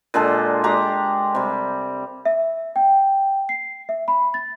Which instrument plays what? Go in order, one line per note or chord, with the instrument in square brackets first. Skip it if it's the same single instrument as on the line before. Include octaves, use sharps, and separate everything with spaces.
[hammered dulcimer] A#2 D3 G#3 A4
G#3 G4 A#5
C3 G3
[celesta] E5
G5
C7
E5
B5
A6